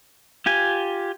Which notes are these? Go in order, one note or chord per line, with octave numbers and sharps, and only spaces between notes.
F4 G4 G#5